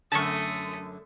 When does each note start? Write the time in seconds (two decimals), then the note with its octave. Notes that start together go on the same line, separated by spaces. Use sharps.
0.12 F#2 D3 A3 A5 C#6 D#6